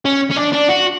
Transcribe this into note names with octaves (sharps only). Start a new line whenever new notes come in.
C#4
C#4
D4
D4
F#4